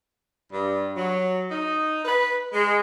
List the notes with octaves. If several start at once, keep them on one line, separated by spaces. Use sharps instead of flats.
G2
F#3
D#4
B4
G#3